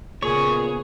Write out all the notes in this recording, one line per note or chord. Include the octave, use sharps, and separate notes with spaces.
A#2 C#3 B3 G#4 C#5